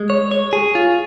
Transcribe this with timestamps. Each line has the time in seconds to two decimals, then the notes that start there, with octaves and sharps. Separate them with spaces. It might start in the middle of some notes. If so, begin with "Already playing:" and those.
Already playing: G#3
0.10 C#5
0.31 C#5
0.53 G#4
0.75 F4